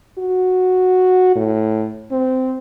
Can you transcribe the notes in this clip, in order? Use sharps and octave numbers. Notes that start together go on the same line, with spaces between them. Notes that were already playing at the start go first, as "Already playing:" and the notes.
F#4
A2
C4